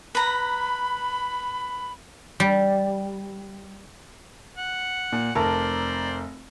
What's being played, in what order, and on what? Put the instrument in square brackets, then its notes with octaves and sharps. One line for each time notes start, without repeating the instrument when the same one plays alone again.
[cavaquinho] B4 A#5 [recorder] B5
[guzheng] G3
[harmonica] F#5
[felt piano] A#2
[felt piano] F1 A#4 A5 [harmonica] C5 D5 A#5